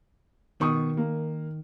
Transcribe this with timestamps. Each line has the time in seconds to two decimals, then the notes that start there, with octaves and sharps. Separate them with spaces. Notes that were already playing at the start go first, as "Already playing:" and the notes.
0.61 B2 D#3 C#6 D#6
0.97 A#3